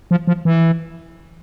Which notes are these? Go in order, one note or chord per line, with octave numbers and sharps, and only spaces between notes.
F3
F3
E3